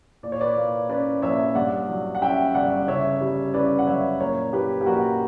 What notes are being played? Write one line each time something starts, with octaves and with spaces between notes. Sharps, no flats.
A#2 D5
C#5
B4 D5
A#3
C#4 B4 D5
A#1 C#5 E5
G2 D5 F#5
F#3
F#5
C#4 E5 G5
G1 D5 F#5
C#3 C#5 E5
G3
C#4 B4 D5
F#5
F#2 C#5 E5
A#2 A#4 C#5
A#3 G4 B4
G4
A#1 F#4 A#4